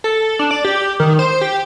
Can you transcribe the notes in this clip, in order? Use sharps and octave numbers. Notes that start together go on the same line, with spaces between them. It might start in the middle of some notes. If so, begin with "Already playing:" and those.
A4
D4
D5
G4
D#3
C5
G4